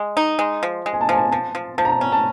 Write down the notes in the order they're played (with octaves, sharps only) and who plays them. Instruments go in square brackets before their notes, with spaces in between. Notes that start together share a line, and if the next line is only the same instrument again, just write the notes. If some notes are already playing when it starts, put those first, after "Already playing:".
Already playing: [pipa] G#3
D#4
G#3
F3
G#3
[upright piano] G#5
A5
[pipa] F3 [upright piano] G#5
[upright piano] A5
[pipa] F3 [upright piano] A5
[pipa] F3
[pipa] F3 [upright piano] A5
[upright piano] A#5
A5
[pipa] C#4
[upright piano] A5